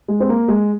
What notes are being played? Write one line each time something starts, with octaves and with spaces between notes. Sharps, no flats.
G#3
C4
A#3
G#3